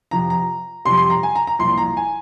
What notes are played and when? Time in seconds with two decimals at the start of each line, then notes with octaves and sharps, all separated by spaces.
0.11 F2 C3 F3 A#5
0.30 A#5
0.85 F2 C3 G3 C6
0.97 C6
1.10 A#5
1.23 G#5
1.36 A#5
1.47 A#5
1.59 C2 A#2 F3 C6
1.78 A#5
1.97 G#5